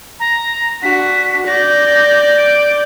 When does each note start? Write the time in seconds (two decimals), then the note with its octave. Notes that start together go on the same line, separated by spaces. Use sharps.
0.20 A#5
0.83 D4 F#4 B6
1.47 D5 G6 A#6
2.38 D7